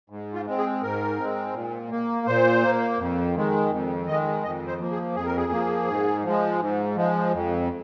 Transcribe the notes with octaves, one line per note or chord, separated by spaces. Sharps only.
G#2
F4
G#3 C4
G#4
G#2 A#4
G#3 C4
A#2
A#3
A#2 C5
A#3
F2
D#3 G#3
F2
D#3 G#3 D#5
F2 D#5
C5
F3 A#3
G#4
F2 G#4
A#4
G#4
F3 A#3
G#2
F3 G#3
G#2
F3 G#3
F2